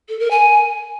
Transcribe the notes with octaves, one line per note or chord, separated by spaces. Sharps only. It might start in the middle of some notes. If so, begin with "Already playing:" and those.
A4
A#4
G#5